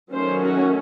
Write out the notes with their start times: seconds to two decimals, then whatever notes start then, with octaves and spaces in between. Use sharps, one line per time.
0.12 D#3 F#3 A3 C#4 C5
0.42 F#4